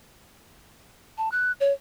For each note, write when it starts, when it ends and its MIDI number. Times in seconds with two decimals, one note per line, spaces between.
1.18 1.29 81
1.32 1.52 90
1.60 1.73 73